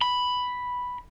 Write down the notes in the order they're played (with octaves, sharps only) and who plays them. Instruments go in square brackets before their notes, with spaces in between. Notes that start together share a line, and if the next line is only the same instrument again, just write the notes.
[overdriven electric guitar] B5